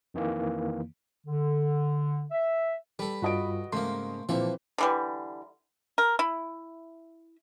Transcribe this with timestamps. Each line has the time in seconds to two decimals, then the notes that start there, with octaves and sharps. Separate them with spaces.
0.14 F2 D#3 E3 A#3
1.26 D3
2.31 E5
2.99 G3 A4 B4
3.22 G2 F4 F#4 D#5 D7
3.73 G#2 C#3 A3 A#3 C6
4.29 A#2 D3 E3 F3 C4 C5 E5
4.78 D3 E3 G3
5.98 A#4
6.19 E4